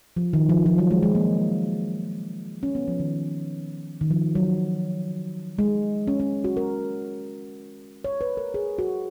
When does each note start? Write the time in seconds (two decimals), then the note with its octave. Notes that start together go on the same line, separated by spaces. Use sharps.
0.17 F3
0.33 D#3
0.49 F3
0.66 F3
0.78 F#3
0.91 G#3
1.03 G#3
1.15 A#3
2.63 C#4
2.75 B3
2.88 F3
3.00 D#3
4.01 D#3
4.11 F3
4.35 F#3
5.59 G#3
6.08 C#4
6.20 C#4
6.44 F#4
6.57 A#4
8.04 C#5
8.21 B4
8.37 A#4
8.54 G#4
8.79 F#4